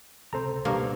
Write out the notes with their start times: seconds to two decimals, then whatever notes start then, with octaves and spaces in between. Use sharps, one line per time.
0.33 C#2 C3 C4 A4 C5 A#5
0.65 G2 B2 A#3 F5 A5